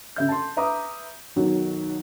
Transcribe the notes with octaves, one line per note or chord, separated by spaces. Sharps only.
C#3 E5 G6
A5 C6
B4 E5 A#5 D6 D#6
B1 D#3 F#3